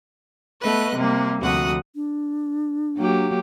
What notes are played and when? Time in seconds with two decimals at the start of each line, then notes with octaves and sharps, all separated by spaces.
0.61 A3 B3 B4 D#5 F#6
0.95 C3 G3 A#3
1.41 D2 C3 F3 F#4 F#5 D#6
1.95 D4
2.97 F#3 A#3 G4